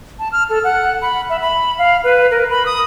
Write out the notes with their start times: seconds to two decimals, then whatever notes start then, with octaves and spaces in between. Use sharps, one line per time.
0.19 A5
0.32 F6
0.49 A4
0.64 F#5
1.02 B5
1.29 E5
1.41 B5
1.78 F5
2.04 B4
2.31 A#4
2.50 B5
2.66 D#6